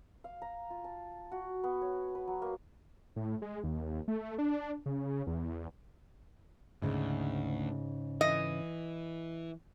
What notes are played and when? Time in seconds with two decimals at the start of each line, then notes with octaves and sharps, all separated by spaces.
0.24 F5
0.42 A#5
0.70 F4
0.84 A5
1.32 F#4
1.64 B3
1.82 C#5
2.15 B4
2.28 F#3
2.42 A#3
3.16 A2
3.42 G#3
3.64 D#2
4.08 A3
4.38 D4
4.86 C#3
5.27 E2
6.82 D2 G#2 C#3
8.21 E3 D#5